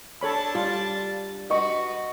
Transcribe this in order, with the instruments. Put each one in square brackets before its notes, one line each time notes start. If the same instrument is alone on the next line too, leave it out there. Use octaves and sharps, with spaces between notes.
[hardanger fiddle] D4 A5 [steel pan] A4 C#5 B5
[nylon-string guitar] G3 [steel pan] F4
[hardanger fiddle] F#4 B4 [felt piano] D#5 C#6